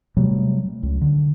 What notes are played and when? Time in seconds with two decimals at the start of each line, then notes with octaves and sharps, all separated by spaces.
0.17 C3 F#3 G3 A3
0.83 C#2
1.01 D3